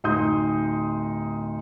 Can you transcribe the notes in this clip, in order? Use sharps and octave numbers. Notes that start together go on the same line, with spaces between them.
D1 D#4 C6 D#6 G6